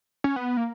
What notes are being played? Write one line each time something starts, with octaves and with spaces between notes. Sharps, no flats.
C#4
B3
A#3